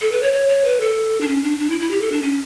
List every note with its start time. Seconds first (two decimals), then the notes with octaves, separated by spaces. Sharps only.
0.01 A4
0.12 B4
0.23 C#5
0.33 C#5
0.49 C#5
0.65 B4
0.80 A4
1.21 D4
1.28 C#4
1.43 D4
1.59 D4
1.70 E4
1.80 E4
1.91 G4
2.01 A4
2.12 D4
2.22 C#4